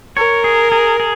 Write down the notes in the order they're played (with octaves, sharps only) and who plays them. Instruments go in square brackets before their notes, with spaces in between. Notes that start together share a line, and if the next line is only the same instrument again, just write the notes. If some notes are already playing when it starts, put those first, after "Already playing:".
[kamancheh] A#4 [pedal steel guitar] C#5
[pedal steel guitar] G#4
G#4
G#4